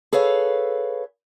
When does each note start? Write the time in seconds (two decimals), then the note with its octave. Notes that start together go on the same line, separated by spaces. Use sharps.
0.13 G#4 A4 B4 C#5 F5